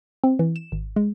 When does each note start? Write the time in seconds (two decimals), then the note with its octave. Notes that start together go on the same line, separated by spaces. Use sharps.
0.24 C4
0.39 E3
0.56 E7
0.72 G#1
0.96 G#3